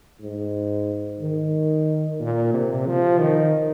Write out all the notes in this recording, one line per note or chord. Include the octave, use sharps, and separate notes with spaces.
G#2
D#3
A#2
C3
F3
D#3